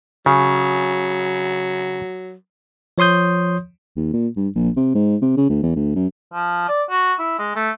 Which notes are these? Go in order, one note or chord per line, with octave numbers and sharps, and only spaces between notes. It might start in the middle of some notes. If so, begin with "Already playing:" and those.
C#3 F#3
F3 C#5 C6 D#6 G6
D#2
A#2
G2
A#1
C3
G#2
C3
C#3
D2
E2
D2
F#2
F3
D5
F#4
E4
G#3
A3